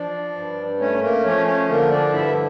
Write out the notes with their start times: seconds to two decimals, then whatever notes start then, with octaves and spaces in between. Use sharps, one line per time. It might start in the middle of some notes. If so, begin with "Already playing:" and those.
Already playing: F3 D4 D5
0.35 G2
0.79 A3 C#4 C#5
1.02 A#3 A#4
1.24 F3 C#4 C#5
1.46 C#4 C#5
1.69 D3 A#3 A#4
1.91 D4 D5
2.13 G2 E4 E5